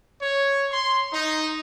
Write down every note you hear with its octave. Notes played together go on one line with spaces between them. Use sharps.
C#5
C6
D#4